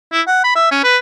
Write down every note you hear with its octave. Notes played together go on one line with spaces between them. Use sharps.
E4
F#5
B5
E5
C#4
B4